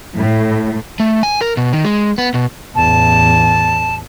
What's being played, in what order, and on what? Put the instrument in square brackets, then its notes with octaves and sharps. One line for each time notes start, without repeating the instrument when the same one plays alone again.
[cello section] A2
[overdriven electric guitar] A3
G#5
A#4
B2
D#3
G#3
B3
B2
[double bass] A1 E2 [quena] A5